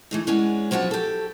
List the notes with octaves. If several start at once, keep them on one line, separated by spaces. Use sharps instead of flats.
E3 A3 D#4
G#3 B3 C#4 D4
F3 F#3 B3 D4 F#4
G4 A4